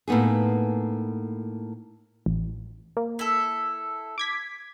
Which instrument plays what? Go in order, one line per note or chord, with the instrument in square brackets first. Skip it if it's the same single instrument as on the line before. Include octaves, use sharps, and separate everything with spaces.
[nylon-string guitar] A2 A#3 B3 D#4 G#4
[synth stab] A1
A#3
[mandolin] E4 A4
[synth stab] D6 G#6 B6